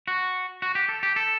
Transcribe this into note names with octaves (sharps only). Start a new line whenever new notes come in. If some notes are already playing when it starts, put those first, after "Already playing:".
F#4
F#4
G4
A4
G4
A4